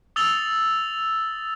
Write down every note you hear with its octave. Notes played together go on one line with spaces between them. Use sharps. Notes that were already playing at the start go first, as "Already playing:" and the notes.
D#6 E6 A6 F7 G7